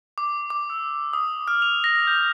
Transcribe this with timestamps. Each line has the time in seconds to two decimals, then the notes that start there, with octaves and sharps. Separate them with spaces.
0.18 D6
0.50 D6
0.70 E6
1.13 D#6
1.48 F6
1.62 F7
1.84 A#6
2.07 G6